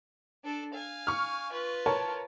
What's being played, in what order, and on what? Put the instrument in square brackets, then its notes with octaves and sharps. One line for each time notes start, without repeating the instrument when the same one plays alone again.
[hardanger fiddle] D4 A4
F5 G#5
[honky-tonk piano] C#6 F6
[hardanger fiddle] F4 B4
[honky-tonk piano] A#4 C#5 A5